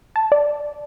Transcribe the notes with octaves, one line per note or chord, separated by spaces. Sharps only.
A5
D5